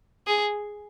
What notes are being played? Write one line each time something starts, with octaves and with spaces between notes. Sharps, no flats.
G#4